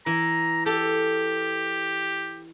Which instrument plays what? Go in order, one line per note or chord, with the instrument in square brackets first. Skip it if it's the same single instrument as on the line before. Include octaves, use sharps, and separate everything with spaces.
[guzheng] E3 [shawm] A#5
[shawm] G4 [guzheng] A4